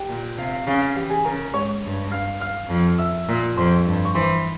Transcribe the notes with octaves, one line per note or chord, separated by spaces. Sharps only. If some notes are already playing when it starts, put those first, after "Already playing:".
Already playing: G4 G5
A#2
C3 F5
F5
C#3 F5
F5
E3 G4 G5
G#4 G#5
C#3 A#4 A#5
G#2 C#5 C#6
G2
F5 F6
F5 F6
F2
E5 E6
A#2
F2 C5 C6
G2
C#6
E3 C5 C6